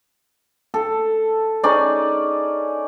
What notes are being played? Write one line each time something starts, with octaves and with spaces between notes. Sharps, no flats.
A4
C#4 D#4 G#4 D5